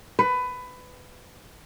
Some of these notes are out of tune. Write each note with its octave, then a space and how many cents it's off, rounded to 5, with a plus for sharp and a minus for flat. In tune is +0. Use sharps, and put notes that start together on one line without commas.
B4 +20